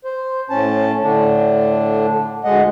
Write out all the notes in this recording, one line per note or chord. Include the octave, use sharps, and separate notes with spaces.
C5
A2 C#4 A5
A2 D3 D4
D2 G#3 D#5 F#5